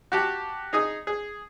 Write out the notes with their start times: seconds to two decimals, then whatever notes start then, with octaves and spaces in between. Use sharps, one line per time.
0.12 F#4 G4 A5
0.73 D#4 G#4 D#6
1.07 G#4